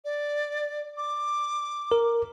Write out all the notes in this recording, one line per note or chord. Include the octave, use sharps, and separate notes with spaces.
D5
D6
A#4